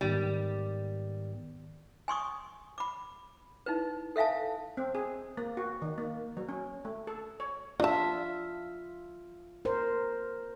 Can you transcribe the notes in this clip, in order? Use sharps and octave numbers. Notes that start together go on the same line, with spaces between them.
G#2 D#3 G3 B3
G#5 C6 C#6 D#6
B5 D6
D#4 E4 B4
A4 E5 F5 G#5 A5
C4
G#4
A#3
F#4
D#3
A#3
F#3
C#4
A3
A4
C#5
D4 F4 E5 A5
A#4 C5